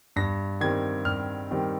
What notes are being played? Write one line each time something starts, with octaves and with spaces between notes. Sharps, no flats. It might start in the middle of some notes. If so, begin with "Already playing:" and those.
G2 A#6
D#3 G3 C4 G#6
G2 F6
D#3 G3 C4